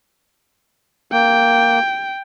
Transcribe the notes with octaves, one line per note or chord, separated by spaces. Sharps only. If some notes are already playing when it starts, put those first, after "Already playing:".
A#3 G5